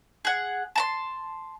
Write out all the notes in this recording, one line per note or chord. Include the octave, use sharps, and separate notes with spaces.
G#4 F#5
A5 A#5 C6